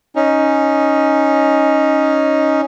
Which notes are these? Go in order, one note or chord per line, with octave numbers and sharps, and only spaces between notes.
C#4 D#4